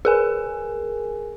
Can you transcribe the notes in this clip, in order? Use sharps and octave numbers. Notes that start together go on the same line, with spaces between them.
G#4 A#4 G#5